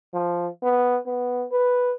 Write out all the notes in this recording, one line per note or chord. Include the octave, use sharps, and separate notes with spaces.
F3
B3
B3
B4